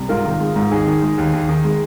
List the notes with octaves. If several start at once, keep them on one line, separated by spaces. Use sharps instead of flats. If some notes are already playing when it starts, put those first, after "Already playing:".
Already playing: C2
G#2 F4 A#4
D#3
G#3
G#2
D#2 D#4 G#4
D#3
G#3
D#2
D#2
D#3
G#3